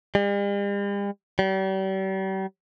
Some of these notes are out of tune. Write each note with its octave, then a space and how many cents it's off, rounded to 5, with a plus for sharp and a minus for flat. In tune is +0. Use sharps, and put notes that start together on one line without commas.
G3 +45
G3 -40